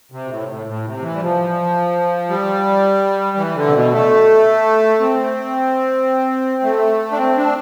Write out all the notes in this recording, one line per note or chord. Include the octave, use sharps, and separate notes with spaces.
C3
B2
A2
A2
A2
C3
E3
G3
F3
G3
E3
D3
C3
B2
A3
C4
A3
D4
C4
D4